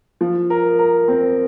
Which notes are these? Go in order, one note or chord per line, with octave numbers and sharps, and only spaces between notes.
F3
A#4
A#4
C4